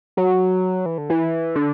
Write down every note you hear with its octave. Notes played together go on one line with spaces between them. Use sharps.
F#3
E3
D3
E3
D3